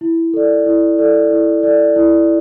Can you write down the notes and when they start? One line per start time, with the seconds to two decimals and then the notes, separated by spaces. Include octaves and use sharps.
0.01 E4
0.34 A4 D5
0.66 E4
0.98 A4 D5
1.31 E4
1.63 A4 D5
1.96 E4